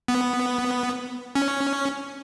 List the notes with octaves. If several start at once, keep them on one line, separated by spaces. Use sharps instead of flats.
B3
C#4